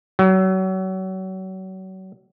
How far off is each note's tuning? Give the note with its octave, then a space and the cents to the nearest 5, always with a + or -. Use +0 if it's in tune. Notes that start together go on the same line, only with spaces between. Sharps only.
F#3 +30